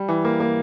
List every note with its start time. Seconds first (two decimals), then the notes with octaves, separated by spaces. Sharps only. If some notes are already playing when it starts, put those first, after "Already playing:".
Already playing: G3
0.08 E3
0.25 A#3
0.40 A#3